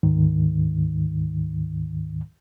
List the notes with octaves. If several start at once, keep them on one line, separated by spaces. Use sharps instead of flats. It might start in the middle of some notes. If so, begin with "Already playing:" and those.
D2 G#2 D#3